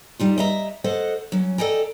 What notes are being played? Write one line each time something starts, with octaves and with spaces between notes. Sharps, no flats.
G3 D#4 F4
D#5 E5 A#5
A4 C5 D#5 F#5
F#3 C#4
A4 D5 D#5 G5 G#5 A#5